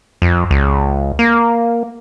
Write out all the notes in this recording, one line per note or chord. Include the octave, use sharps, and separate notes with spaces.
F2
C#2
A#3